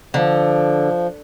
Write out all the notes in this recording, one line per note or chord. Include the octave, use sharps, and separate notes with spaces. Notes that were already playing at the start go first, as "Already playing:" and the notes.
D3 F3